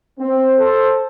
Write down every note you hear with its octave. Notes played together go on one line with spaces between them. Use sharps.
C4
A4 C5